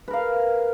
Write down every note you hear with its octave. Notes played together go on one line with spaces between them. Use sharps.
A#4 B4 F5